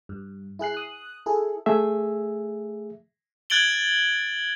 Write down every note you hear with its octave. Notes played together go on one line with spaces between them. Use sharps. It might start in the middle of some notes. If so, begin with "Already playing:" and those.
G2
E4 G#4 F#6 C7
D#6 F#6
E4 G#4 A4
A3 G#4 E5
F#6 G#6 A6 D7 F#7 G7